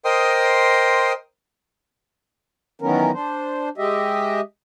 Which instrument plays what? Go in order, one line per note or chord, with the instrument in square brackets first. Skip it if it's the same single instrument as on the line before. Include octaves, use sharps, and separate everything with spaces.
[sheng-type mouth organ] A#4 C5 D#5 G5 C6 D#6
[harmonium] D#3 E3 F#3 B3 C#4 A#4
D4 C5
G#3 G4 D#5 E5